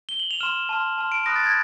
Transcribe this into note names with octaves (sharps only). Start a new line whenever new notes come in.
G7
F#7
F7
C6 F6 E7
A5 C6 F6
A5 C6 F6
D7
B5 D#6 F#6 A#6
A6
G#6